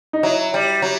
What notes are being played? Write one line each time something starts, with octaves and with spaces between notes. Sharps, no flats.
D#4
F#3 E4
G3
F#3